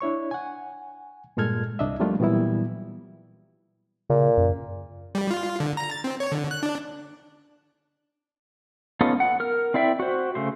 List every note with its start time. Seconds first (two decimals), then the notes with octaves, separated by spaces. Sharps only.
0.01 D4 E4 C#5 C#6
0.31 F#5 G#5
1.37 G2 A#2 G#3 A4 F6 G#6
1.79 C2 D4 D#5 E5
2.00 F3 G3 A3 A#3 D4 F4
2.19 A#2 E3 F#3 G3 B3 E4
4.10 A#2 C#3
4.38 F#2
5.15 G3
5.31 F4
5.60 D3
5.77 A#5
5.91 A6
6.04 C4
6.20 C#5
6.32 D3
6.51 F#6
6.63 D4
9.01 B3 C#4 D#4 F4 A4
9.20 F#5
9.40 A#4 F6
9.74 C4 E4 D5 E5 G5
10.00 F#4 C5
10.35 C#3 A3 C5